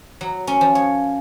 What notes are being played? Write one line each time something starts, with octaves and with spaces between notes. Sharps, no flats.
F#3
C#4
F3
C#5